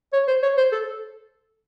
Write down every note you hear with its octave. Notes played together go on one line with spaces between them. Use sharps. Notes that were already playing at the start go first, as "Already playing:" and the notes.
C#5
C5
C#5
C5
A4